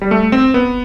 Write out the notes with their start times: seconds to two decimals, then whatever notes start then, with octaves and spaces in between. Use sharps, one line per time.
0.01 G3
0.11 A3
0.32 C4
0.54 B3